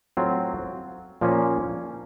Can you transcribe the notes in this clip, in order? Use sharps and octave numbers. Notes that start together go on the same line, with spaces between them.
A2 F#3 C4 F4
A#2 F3 A#3 C#4